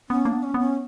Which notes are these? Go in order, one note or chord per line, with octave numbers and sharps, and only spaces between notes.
B3 C#4
A#3 D4
B3
C#4
B3
C#4